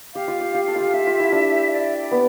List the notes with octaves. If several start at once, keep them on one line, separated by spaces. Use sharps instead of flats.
G4 F5
F4
G4
G4
A4
F4 G4
G4 E5
F4
E4
D4
D5
B3